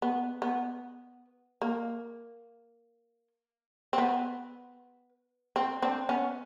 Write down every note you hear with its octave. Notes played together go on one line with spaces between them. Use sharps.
B3
B3
A#3
C4
B3
C4
C4 D4
B3 C#4